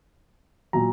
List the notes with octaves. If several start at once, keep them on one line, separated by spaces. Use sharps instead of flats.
A#2 F#3 A#5